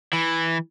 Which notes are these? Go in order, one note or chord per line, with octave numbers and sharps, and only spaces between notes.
E3